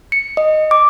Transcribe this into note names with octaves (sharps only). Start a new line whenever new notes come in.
C#7
D#5
D6